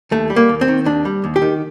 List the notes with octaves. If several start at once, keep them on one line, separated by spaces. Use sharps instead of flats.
D#2 A3
G3
A#3
D#2
C4
D#3
D#2 D4
G3
D#2
G4
D#3